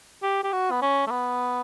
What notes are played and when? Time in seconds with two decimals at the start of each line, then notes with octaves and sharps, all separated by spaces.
0.23 G4
0.44 G4
0.52 F#4
0.71 B3
0.82 C#4
1.07 A3
1.11 B3